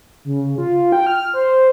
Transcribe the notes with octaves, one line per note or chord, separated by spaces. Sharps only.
C#3
F4
G5
F6
C5